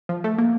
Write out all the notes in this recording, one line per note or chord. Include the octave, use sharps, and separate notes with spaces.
F3
A3
A#3